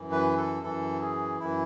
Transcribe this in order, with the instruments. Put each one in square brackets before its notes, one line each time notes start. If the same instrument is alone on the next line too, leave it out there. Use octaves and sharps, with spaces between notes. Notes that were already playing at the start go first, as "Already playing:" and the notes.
Already playing: [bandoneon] F#2 E3
B4
A4
F#2 E3 A4
G#4
F#2 E3 E4